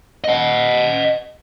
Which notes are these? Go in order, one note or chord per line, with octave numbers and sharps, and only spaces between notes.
D#5 F#5